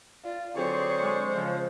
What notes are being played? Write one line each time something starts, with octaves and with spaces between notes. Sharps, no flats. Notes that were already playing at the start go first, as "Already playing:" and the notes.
F4 D5
D3 F#3 C4 G#4 C5 D5 C#6
G#3
C#3 F3